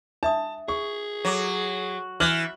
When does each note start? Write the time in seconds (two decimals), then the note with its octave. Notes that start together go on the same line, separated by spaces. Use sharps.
0.23 D4 E5 A5 D#6
0.68 G#4 C#6
1.25 F#3 A4 D6
2.20 E3 E5 F6 F#6 F#7